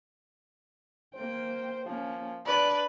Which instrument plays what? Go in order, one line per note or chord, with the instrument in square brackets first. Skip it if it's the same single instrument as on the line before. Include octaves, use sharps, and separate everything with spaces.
[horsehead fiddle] A#3 G5 [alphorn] C5
[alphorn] F3 [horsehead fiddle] A#3 C#4
[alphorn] D4 [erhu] B4 [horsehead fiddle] D5